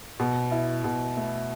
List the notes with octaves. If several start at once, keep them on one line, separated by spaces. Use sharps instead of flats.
B2
E4
B2
A3